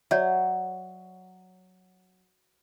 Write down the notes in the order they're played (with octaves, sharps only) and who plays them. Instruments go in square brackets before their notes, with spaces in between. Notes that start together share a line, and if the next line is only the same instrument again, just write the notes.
[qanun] F#3 [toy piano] C#5 D5 E5